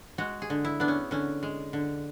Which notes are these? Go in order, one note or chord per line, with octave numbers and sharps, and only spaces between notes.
G#3 F#4
G#4
D3
E4
B3 D4
C#4
D3 C#4
G#3
D3